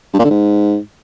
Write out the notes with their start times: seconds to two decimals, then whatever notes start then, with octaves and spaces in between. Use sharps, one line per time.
0.13 G2
0.19 A#2
0.25 D3
0.30 G#2